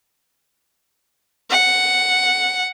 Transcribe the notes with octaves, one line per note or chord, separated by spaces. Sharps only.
F#5